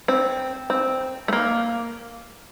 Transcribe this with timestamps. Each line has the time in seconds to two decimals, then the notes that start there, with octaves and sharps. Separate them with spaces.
0.08 C4
0.70 C4
1.28 A3
1.33 A#3